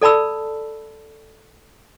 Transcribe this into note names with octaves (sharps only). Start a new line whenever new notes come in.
A4 D5 A5 B5 E6